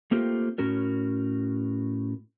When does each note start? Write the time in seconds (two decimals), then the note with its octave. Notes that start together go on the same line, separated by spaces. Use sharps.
0.11 A3 A#3 C4 F4 G4
0.58 A2 C#4 F#4 A#4